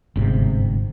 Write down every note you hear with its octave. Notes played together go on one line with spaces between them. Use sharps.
G1 G#2 C3